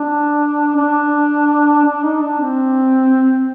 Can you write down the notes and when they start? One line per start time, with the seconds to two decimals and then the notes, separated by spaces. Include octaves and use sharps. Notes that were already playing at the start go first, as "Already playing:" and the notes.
Already playing: D4
0.76 D4
1.85 D4
2.03 D#4
2.21 D4
2.40 C4